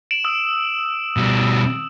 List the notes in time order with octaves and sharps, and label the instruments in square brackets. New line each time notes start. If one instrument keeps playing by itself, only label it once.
[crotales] D7 E7 F#7
D#6 E6
[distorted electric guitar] B2 G3